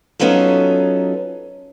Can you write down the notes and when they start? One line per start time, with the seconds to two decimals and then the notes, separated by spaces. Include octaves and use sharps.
0.19 F#3 B3 C#4 D#4 F4 A4